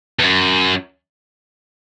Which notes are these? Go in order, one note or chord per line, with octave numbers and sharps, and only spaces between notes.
E2
F#2